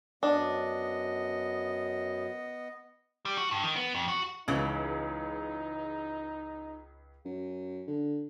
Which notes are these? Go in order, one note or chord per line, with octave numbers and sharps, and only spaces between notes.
F#2 B3 D4 D#5
G3
F#4
G2
D#3
B3
F2
F#4
C#2 C#3 E3 D#4
F#2
D3